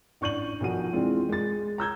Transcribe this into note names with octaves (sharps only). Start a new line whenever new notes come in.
A1 D4 C#6 G6 D#7 F#7
B1 B2 D#3 F3 F#4 D#7
E3 G#3 C4 D4 F4
G#3 A6
A#5 E6 G6 G#6